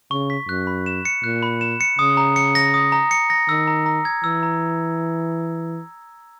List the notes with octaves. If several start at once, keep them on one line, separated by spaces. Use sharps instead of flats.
C#3 C#6
B6
F#2 F#6
B5
E7
C#7
A#2 F#6
B5
E7
C#7
C#3 D#6
A#5
C#7
A#6
D#6
A#5
C#7
A#6
D#3 E6
A#5
A#5
G#6
E3 E6
A#5